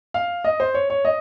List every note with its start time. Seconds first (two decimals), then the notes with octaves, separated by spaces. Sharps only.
0.14 F5
0.44 D#5
0.60 C5
0.74 C#5
0.90 C#5
1.05 D#5